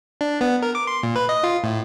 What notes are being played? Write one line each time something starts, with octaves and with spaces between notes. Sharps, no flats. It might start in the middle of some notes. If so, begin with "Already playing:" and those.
D4
B3
A#4
D6
C6
A#2
B4
D#5
F4
A2